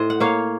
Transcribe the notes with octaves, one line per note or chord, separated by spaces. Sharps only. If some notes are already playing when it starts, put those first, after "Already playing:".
Already playing: A2 C5 D#5
F#5
A#3 C#5 F5